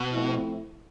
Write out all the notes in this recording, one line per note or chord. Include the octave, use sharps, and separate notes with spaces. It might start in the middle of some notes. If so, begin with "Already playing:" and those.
Already playing: B2
F3 A3 C4 E4